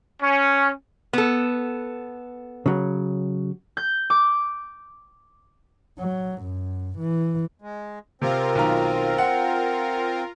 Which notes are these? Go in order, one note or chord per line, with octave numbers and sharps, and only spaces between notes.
C#4
B3 A4
C#3 F#3
G6
D6
F#3
F#2
E3
G#3
C3 C4 F4 A#4
B1 D#3 A#5
F#5